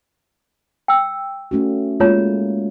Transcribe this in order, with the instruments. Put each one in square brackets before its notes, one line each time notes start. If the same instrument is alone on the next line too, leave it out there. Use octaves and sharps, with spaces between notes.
[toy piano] G5 E6
[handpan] A3 C#4 F#4
[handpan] G#3 A#3 [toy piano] F4 C#5 A#5